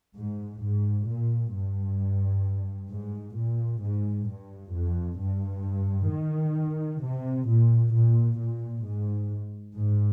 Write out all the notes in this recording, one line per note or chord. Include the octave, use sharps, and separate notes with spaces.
G#2
G#2
A#2
G2
G#2
A#2
G#2
G2
F2
G2
D#3
C3
A#2
A#2
A#2
G#2
G#2